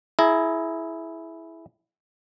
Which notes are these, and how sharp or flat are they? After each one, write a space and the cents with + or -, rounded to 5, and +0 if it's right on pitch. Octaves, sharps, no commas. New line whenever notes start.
E4 +0 G#4 +25 A#5 +0